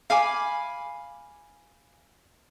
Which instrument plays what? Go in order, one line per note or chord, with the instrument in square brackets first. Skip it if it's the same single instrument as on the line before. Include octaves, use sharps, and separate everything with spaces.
[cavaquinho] F5 G#5 B5 D6